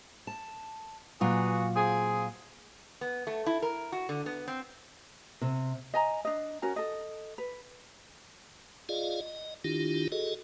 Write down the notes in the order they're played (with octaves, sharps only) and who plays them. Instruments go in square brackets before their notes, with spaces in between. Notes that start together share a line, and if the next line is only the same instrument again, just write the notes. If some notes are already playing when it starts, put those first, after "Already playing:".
[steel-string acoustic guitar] A5
[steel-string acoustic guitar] A#2 F#3 F4 [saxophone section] F#4 G#4 B4
[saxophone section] C4 G#4
[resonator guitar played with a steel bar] B3
A3
E4
A#4
F#4
D3
B3
C4
[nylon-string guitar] C3
[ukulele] D#5 G#5 A#5
D4 D#5
C#4 F#4 A#4 G#5
A4 D#5
B4
[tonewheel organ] F4 G#4 D5 D#5 F5
D#5
D#3 D4 E4 F4 G4
F#4 G#4 A4 D#5